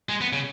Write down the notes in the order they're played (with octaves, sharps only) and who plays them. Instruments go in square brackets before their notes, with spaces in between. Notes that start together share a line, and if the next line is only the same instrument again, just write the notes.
[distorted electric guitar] G#3
B3
C#3